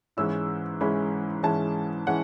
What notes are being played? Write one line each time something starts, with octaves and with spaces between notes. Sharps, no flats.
G#2 E3 G#3 C#4 E4 E6
G#2 E3 G#3 C#4 E4 B5
G#2 E3 G#3 C#4 E4 A5
E3 G#3 C#4 F#5